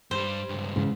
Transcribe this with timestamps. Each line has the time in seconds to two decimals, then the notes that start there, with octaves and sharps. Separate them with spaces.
0.11 G2 G3 C5
0.49 C#2 G2
0.76 G#2 C#3 E3